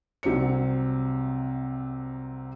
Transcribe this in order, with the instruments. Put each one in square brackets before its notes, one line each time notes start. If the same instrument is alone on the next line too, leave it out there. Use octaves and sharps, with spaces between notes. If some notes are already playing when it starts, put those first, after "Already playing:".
[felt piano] C2 C3 F#3 C5 C#7